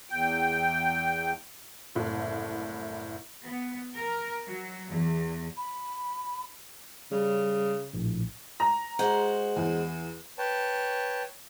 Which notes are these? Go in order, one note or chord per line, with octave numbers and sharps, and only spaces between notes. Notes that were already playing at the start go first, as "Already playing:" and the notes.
E2 G5
F#1 C2 A2
B3
A#4
F#3
E2
B5
C#3 G3
A#1 A2
A#5
G#3 F#4 C5
E2
B4 C#5 G5 A5